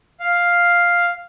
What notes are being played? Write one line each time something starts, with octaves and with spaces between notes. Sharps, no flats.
F5